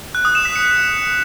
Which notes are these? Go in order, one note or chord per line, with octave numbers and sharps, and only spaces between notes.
F#6
D#6
E7
B6
C#7